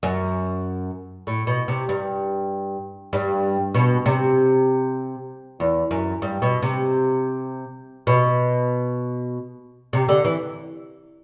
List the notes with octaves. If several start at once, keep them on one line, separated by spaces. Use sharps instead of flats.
F#2
A2
B2
C3
G2
G2
B2
C3
E2
F#2
G2
B2
C3
B2
C3
D3
E3